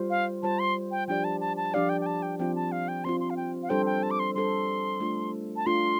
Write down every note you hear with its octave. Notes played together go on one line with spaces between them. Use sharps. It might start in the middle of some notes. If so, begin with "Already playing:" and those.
Already playing: G3 F4 C5
F5
G3 F4 C5 A5
C6
G5
F3 D4 G4 D5 G5
A5
A5
A5
F3 D4 G4 D5 F5
G5
G5
A5
G5
F3 C4 F4 G5
A5
F5
G5
F3 C4 F4 C6
C6
F5
G5
F5
G3 D4 A4 C5 G5
G5
A5
D6
C6
G3 D4 A4 C5 C6
A3 D4 F4
A5
A3 D4 F4 C6